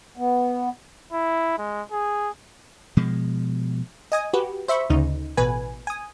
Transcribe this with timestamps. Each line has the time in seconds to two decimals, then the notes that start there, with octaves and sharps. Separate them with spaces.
0.17 B3
1.13 E4
1.58 G#3
1.92 G#4
2.97 B2 F3 G#3
4.12 D#5 G#5 D#6
4.33 F#4 G4 B4
4.68 C5 E5 B5 C#6
4.90 D2 C#3 D#4
5.37 A1 B2 B4 G#5
5.87 G#5 D#6